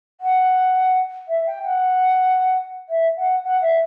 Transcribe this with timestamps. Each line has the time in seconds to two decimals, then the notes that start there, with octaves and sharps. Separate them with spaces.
0.21 F#5
1.28 E5
1.47 G5
1.64 F#5
2.89 E5
3.17 F#5
3.44 F#5
3.62 E5